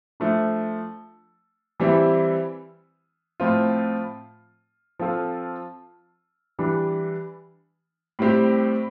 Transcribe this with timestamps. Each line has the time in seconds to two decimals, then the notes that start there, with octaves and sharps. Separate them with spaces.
0.20 F3 A3 D4
1.80 E3 G3 C4 E4
3.40 A2 F3 C4 F4
4.99 F3 C4 F4 A4
6.59 E3 G3 D4
8.19 A2 G3 C4 G4